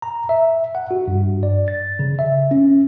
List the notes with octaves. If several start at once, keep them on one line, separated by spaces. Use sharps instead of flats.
A#5
E5
F#5
F#4
G2
D5
A6
C#3
E5
C#4